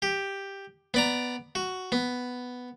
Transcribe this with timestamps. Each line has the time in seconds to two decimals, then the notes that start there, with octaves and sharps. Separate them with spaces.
0.02 G4
0.94 B3 D5 A#5
1.55 F#4
1.92 B3